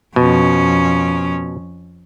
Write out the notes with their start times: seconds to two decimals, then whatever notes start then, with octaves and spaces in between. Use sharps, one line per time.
0.16 F2 B2 C#4